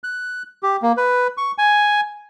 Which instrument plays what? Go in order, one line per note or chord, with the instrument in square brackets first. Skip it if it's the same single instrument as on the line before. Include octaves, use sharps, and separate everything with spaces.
[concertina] F#6
G4
A#3
B4
C#6
G#5